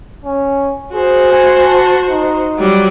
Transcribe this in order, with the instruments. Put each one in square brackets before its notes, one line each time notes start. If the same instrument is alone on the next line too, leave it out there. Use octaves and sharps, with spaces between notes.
[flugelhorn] C#4
[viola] F#4 C5 [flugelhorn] G#4
[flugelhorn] G#5
A5
D#4
[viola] F#3 G3